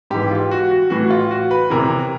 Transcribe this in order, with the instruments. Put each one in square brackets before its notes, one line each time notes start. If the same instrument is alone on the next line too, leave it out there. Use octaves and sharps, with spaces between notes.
[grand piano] G#2 E3 G4
F4
F#4
F#4
A2 E3 F#4
F4
F#4
B4
E2 C3 E3 A#4